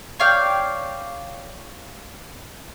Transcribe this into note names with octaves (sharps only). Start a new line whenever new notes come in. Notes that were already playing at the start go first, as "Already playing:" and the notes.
C#5 D5 F5 G5